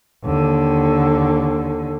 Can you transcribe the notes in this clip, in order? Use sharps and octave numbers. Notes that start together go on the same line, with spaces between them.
D#2 D3